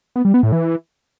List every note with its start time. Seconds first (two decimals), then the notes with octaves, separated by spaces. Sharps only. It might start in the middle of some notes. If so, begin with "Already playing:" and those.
0.16 B3
0.25 G3
0.34 B3
0.43 A2
0.52 E3